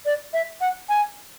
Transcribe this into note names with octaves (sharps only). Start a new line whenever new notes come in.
D5
E5
F#5
G#5